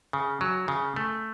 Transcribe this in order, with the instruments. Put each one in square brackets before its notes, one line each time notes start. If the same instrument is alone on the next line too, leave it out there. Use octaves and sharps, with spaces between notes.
[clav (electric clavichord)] C#3
F#3
C#3
A3